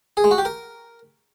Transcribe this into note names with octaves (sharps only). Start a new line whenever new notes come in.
G#4
G#3
F#4
G4
A#4